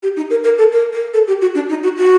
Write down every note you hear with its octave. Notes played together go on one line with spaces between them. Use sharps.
G4
D#4
A#4
A#4
A4
A#4
A#4
A4
G4
F#4
D4
D#4
F#4
F#4